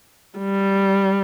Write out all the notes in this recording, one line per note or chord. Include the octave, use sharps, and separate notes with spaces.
G3